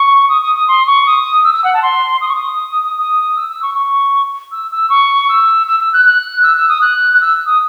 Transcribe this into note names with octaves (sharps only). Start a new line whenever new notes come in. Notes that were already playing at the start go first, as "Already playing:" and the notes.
Already playing: C#6
D#6
D#6
D#6
C6
C#6
D#6
E6
E6
F#5
A5
C6
D#6
C#6
D#6
D#6
E6
E6
C#6
C#6
E6
E6
C#6
E6
E6
E6
F#6
F#6
E6
E6
D#6
F#6
F#6
E6
D#6